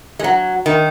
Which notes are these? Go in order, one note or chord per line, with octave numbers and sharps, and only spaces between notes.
G#3
F#3
D#3